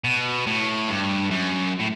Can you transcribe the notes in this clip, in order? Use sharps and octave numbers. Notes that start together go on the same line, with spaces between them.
B2
A2
G2
F#2
A2